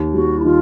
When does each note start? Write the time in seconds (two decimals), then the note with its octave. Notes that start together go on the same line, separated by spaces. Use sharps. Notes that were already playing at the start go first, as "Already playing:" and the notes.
Already playing: D#2
0.14 G3 F#4
0.39 E4
0.44 D#3 F4